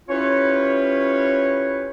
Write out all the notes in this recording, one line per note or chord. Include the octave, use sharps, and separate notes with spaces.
C#4 E4 F4 G4 B4 C#5